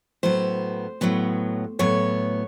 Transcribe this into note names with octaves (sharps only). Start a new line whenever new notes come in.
A2 F#3 B3 C5
A2 F#3 B3
A2 F#3 B3 C#5